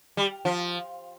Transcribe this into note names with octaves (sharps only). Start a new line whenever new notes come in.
G3
F3